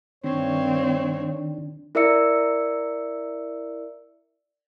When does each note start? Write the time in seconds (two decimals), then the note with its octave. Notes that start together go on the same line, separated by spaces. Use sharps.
0.24 G2 D#3 C4 D4 C#5
1.95 E4 A#4 D5 E5 E6 C#7